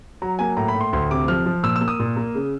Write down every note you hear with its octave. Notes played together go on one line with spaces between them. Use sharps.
F#3 A#5
A#3 G#5
A2 A#5
B5
A2
C6
D2 C6
C3 D6
F3 F6
F3
A#2 E6
E6
A#3
D#6
A#2
A#3
C#3